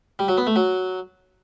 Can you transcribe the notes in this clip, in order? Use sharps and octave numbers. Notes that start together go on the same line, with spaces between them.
G3
F#3
B3
A3
F#3